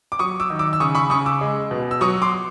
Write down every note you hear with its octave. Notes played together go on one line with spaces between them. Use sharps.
D6
F#3 C#6 D#6
D6 E6
D#3
D6 E6
E6
C#3 C#6 D#6
B5 C#6
C#3 C#6 D#6
D6 E6
G#3
B2
E6
F#3 C#6 D#6
C6 D6